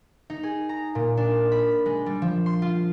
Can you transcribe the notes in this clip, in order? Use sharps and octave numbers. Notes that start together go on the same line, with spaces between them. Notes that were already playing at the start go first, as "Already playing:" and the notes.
D#4
G#4
A#5
A#2
D4
B5
G#3
G3
F3
C6
F4